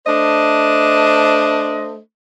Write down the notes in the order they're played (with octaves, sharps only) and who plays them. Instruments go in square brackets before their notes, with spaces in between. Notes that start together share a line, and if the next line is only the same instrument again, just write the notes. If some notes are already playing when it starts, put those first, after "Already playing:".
[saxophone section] A3 D4 C5 D#5